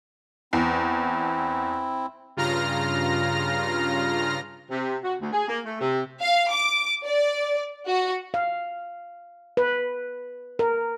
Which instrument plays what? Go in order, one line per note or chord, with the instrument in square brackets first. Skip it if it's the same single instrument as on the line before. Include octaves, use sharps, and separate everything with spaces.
[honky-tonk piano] E2 [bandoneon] C4 E4
[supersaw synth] G2 C#3 F4 A#5 F6 A#6
[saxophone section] C3
F#4
D2
G#4
A#3
A3
C3
[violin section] F5
D6
D5
F#4
[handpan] F5
B4
A#4